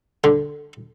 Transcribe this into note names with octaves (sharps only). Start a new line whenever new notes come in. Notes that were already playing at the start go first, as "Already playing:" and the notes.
D3